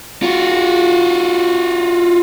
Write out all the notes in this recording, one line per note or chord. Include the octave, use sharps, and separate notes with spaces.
F4 F#4